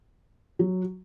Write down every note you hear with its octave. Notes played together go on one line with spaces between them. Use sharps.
F#3